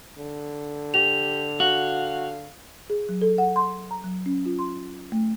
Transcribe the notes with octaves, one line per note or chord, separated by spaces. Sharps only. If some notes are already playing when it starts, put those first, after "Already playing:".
D3
G4 F7
F#4 F5
G#4
F#3
A4
F#5
C6
A#5
F#3
C#4
F4
C6
A3